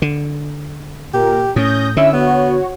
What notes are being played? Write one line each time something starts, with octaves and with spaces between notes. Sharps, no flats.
D3
A#2 G4 A#4
A2 C#4 D#6 G6 A#6
D3 C#4 E4 E5 E6
B3 F#4 C#5